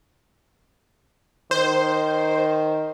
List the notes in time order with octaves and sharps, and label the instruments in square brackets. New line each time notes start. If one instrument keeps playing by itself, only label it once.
[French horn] D#3 [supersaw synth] C5